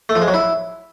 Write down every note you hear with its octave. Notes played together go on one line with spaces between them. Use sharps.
A3
F3
G#3
F#3
E4